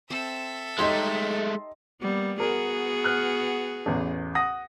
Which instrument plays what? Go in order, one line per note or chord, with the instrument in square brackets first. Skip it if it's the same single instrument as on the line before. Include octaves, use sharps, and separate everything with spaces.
[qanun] C4 [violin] A4 E5
[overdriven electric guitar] G#3 A3 [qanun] D#4 G4 C#5 [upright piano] D#5 C6
[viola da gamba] G3 A#3 B3
[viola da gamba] B3 F#4 G#4 [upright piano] A#4
[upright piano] F6 F#6
A1 E2
F#5 D#6 A#6